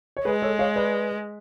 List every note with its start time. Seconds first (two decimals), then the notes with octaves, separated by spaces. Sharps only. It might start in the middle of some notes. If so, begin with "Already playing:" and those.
0.17 C#5
0.25 G#3 G#4 B4
0.42 A4 C#5
0.59 C#5 F5
0.76 B4 D5